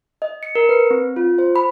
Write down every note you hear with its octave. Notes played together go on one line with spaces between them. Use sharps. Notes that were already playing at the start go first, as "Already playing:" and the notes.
D#5
C#7
A#4
B4
C4
F4
C5
B5